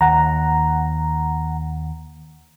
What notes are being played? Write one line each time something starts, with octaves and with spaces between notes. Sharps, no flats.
D#2 F#5 A#5